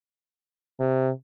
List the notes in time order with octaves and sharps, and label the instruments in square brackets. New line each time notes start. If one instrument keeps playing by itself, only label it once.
[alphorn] C3